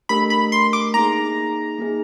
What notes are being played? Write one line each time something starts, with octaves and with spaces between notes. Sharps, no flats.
A3 D4 G4 A#4 B5
B5
C6
D6
A#3 D#4 G#4 A#5
A#3 D#4 G#4